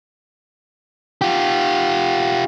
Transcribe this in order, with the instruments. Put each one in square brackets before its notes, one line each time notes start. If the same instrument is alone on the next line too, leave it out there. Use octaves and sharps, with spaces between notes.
[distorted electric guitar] F4 G4